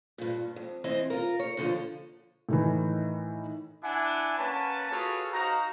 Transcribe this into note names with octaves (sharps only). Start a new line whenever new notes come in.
G2 A#2
F2
E3 C4 D#5
F4 A#4
C#5
A#2 D3 D#3 F3
A2 D#3 E3
D4 E4 F#5 G#5
A#3 C#4 B4 C#5 F#5 A5
F4 F#4 G#4 A4 B4 C#5
D#4 F#4 C5 F5 A#5